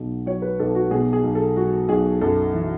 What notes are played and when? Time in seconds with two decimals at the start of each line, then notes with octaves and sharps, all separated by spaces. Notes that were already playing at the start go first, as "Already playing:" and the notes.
Already playing: B1 B2
0.26 F#3 C#5
0.42 B4
0.59 B1 A4
0.75 F#4
0.91 B2 G#4
1.13 G#4
1.23 B1
1.35 A4
1.56 F#3 F#4
1.89 B1 G#4
2.21 F#2 A4
2.53 E3